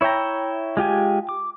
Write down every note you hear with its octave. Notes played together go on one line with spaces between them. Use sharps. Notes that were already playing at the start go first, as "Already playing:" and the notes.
E4 C#5 E5 G5 A#5
G#3 F4 G4 G#5
D6